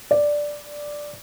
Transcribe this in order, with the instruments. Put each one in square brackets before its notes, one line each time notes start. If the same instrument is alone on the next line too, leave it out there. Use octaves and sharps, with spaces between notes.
[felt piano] D5